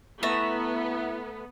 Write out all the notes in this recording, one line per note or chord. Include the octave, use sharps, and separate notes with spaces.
A3 B3 E4 E5 A#5